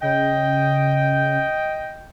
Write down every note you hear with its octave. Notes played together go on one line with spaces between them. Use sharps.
C#3 D#5 G5